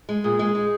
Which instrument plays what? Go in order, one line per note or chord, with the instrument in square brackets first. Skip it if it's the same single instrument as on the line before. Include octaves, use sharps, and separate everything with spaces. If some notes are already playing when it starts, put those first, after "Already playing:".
[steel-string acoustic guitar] G#3
[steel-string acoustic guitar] A#2 [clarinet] G#4
[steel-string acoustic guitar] G#3
D#4